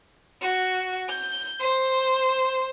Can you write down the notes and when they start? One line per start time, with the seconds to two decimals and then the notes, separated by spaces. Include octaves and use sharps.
0.42 F#4
1.09 G6
1.60 C5